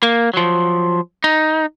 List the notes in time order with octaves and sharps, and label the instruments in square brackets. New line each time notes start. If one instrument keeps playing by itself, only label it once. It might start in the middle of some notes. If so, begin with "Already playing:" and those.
[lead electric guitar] A#3
F3 F#3
D#4